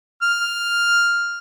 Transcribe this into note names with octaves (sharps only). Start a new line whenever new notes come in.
F6